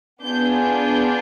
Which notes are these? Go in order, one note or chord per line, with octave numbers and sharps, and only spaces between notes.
B3 D4 F4 G#4 G6
G6